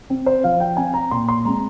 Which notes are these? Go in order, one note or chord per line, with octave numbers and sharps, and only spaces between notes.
C4
C5
F3 F5
G5
C4 G#5
A#5
A#2 C6
C6
G#3 C4 A#5